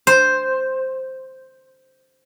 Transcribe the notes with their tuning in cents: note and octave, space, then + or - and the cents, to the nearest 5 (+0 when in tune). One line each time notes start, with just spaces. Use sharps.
C5 +0